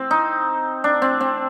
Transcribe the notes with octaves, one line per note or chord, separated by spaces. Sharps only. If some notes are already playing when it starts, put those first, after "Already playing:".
Already playing: C4
D#4
D4
C4
C4